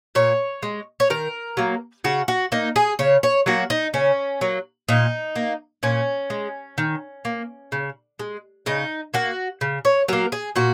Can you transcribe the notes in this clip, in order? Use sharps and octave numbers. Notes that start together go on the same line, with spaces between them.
A#2 C#5
G#3
C#5
D#3 A#4
F#3 A#3
C#3 F#4
F#4
A#3 D#4
G#4
C#3 C#5
C#5
F#3 A#3 F#4
D#4
C#3 C#4
F#3 A#3
A#2 D#4
A#3
A#2 C#4
G#3
D#3
A#3
C#3
G#3
C#3 D#4
A#3 F#4
C#3
C#5
F#3 A#3 A#4
G#4
A#2 F#4